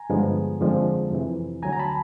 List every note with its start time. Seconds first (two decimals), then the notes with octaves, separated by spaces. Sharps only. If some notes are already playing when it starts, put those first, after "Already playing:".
Already playing: G#5 A#5
0.10 G2 D3 F3 G#3 B3
0.61 F2 D3 F3 G#3 C4
1.11 F2 C3 E3
1.62 D2 D3 F#3 G#5 A#5
1.73 A#5
1.79 A5 B5